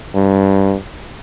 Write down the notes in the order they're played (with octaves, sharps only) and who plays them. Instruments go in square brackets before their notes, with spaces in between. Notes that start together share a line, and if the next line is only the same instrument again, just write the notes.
[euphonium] G2